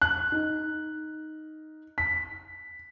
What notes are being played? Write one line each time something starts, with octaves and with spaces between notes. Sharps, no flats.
F#6
D#4
B6